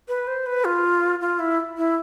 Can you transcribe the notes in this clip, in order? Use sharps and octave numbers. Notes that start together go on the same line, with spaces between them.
B4
C5
B4
F4
F4
E4
E4